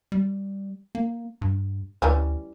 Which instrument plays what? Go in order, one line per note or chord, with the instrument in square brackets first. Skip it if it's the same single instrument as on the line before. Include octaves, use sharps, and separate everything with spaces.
[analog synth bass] G3
A#3
G2
[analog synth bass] D2 [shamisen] E3 G3 C#4